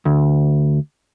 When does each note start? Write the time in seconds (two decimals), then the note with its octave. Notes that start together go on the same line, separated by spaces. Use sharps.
0.05 D2